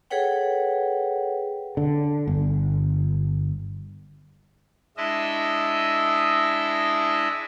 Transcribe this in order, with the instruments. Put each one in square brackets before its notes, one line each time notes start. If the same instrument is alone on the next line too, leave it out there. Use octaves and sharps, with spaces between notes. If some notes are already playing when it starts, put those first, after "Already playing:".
[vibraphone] G#4 A4 B4 C#5 F#5 G5
[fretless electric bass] D3
G1
[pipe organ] G#3 D4 E4 D#5 E5